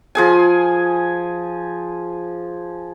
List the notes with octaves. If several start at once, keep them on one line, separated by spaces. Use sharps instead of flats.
F3 G#4 G#5